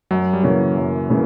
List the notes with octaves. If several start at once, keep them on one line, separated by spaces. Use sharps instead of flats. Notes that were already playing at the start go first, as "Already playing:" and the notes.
F#2 F#3
G3
C#3 E3 F#3 A#3 C#4
F#2
C#3 E3 A#3 C#4